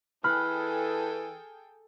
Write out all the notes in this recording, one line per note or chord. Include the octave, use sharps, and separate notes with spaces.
E3 G#4 A4 G5 B5 F6 F#6